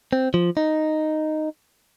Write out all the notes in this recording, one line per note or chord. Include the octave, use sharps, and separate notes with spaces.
C4
F3
D#4